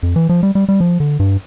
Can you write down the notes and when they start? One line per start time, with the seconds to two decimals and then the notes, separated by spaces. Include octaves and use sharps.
0.03 F2
0.16 E3
0.29 F3
0.43 G3
0.55 G3
0.69 G3
0.80 F3
1.00 D3
1.20 G2